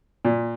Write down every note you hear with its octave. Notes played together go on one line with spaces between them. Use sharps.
A#2